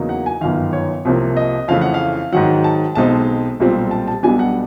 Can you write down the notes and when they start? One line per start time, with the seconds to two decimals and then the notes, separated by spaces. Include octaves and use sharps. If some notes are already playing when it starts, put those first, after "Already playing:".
Already playing: E2 C#3 F#3 A#3 D#4
0.09 F#5
0.26 G#5
0.41 G1 F#2 D#3 F5
0.73 C#5
1.05 C2 C3 F3 A#3
1.36 D#5
1.68 F2 C#3 E3 A3 F5
1.81 F#5
1.94 F5
2.32 G#2 D#3 F#3 F#5
2.64 A5
2.95 B1 B2 G#3 C4 D#4 A5
3.60 B1 A#2 G3 C4
3.91 A5
4.08 A5
4.23 B1 B2 G3 B3 D4 G#5
4.39 F#5